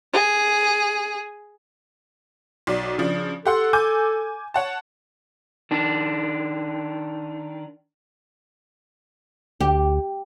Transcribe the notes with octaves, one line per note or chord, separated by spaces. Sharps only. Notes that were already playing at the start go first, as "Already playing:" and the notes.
G#4
B1 D5
C#3 F3 D4
G4 A4 F#5 C6
G#5 D6 G6
C#5 F#5 A5
D#3 D4
D2 G4